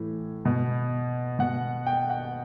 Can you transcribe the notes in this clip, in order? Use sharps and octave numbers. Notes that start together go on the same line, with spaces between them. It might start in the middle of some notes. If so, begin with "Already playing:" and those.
Already playing: A2 E3
B2
B2 F#5
G5
F#5